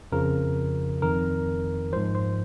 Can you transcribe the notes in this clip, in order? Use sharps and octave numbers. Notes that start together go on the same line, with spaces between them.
F2 C#3 F3 A#4
F2 D#3 A#4
G#2 F3 C5
C5